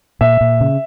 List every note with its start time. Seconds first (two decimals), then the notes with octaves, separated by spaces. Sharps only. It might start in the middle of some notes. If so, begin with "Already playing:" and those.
0.21 A#2 E5
0.41 A#2
0.61 C#3